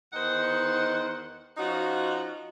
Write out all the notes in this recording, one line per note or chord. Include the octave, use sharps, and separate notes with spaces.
E2 D#3 D#4 C5 F#5
F3 C#4 D#4 F#4